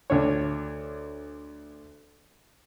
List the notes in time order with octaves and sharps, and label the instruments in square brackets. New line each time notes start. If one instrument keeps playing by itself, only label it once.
[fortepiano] D2 D4 C#5